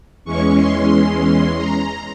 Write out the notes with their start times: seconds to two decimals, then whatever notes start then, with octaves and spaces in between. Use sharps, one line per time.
0.25 E2 E3 G#3 C#4 C#6
0.54 C6
0.84 C6
1.13 C6
1.56 A#5